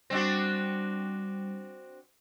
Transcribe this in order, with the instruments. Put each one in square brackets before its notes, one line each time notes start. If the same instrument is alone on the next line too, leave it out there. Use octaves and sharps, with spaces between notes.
[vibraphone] G3 [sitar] C4 D4 F#4